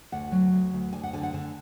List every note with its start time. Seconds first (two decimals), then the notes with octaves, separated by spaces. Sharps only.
0.12 D2 F#5
0.32 F#3
0.53 D2
0.73 D2
0.93 D2 G#5
1.03 F#5
1.13 D3 G#5
1.23 F#5
1.33 D3 G#5